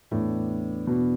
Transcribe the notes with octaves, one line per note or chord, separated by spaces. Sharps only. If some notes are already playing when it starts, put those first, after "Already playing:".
E2 A2 E3 B3 D4
B2